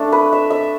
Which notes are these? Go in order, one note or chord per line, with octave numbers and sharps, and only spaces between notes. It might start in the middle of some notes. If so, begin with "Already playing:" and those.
Already playing: A3 D4
B4
E5
E5